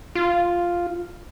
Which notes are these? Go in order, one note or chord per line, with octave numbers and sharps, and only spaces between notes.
F4